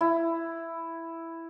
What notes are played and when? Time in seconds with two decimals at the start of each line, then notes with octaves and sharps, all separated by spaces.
0.01 E4